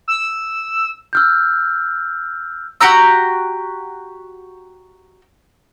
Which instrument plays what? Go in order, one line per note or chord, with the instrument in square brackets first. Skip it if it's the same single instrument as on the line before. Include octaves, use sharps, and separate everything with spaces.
[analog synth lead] E6
[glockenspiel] E6 F6 G6
[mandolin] F#4 G4 A#5 E6